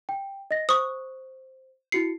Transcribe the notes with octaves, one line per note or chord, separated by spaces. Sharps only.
G5
D#5 A#6
C5 C#6 D#6
E4 F#4 C7 C#7